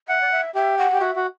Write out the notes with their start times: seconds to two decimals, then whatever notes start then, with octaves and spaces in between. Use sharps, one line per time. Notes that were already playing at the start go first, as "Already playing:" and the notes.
0.08 E5 F#5
0.21 D5
0.31 E5
0.55 G4 E5
0.78 F#5
0.93 G4
1.00 F#4 E5
1.16 F#4